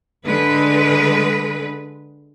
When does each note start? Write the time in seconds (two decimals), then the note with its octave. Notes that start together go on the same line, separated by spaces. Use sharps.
0.24 D3 G#3 B4